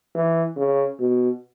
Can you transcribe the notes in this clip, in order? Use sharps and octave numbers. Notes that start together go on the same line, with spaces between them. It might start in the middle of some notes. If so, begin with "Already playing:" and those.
E3
C#3
B2